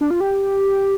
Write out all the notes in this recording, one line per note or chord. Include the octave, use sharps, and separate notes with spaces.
D4
F4
G4